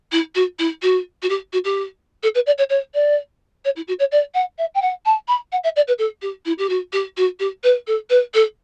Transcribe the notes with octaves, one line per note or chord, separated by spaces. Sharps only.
E4
F#4
E4
F#4
F#4
G4
F#4
G4
A4
B4
D5
C#5
C#5
D5
C#5
E4
F#4
C#5
D5
F#5
E5
G5
F#5
A5
B5
F#5
E5
D5
B4
A4
G4
E4
G4
F#4
G4
F#4
G4
B4
A4
B4
A4